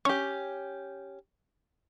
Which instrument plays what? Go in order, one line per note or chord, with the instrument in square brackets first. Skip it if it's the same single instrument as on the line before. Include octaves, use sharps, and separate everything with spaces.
[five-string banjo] C#4 G4 [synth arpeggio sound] C#6